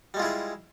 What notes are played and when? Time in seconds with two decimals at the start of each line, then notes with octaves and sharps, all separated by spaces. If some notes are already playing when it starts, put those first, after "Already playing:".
0.14 G3
0.17 G#3
0.19 F4
0.22 E4
0.25 G#4